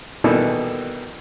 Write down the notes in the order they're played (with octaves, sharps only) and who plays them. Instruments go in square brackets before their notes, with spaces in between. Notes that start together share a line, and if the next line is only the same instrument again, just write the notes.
[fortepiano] B2 D#3 E3 G3 E4 A4